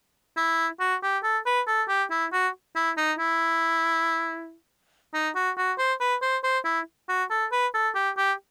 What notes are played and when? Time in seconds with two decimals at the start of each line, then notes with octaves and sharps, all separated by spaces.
0.37 E4
0.80 F#4
1.03 G4
1.23 A4
1.46 B4
1.67 A4
1.88 G4
2.10 E4
2.32 F#4
2.75 E4
2.97 D#4
3.19 E4
5.14 D#4
5.35 F#4
5.57 F#4
5.78 C5
6.00 B4
6.22 C5
6.43 C5
6.65 E4
7.08 F#4
7.30 A4
7.52 B4
7.74 A4
7.95 G4
8.17 G4